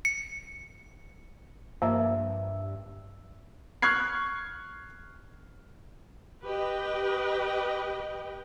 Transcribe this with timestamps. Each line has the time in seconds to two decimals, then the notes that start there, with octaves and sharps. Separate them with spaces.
0.05 C#7
1.82 G2 F3 A#3 D#5 E5 E6
3.82 C#6 F6 F#6 G#6 C7
6.43 G4 B4 D#5 G5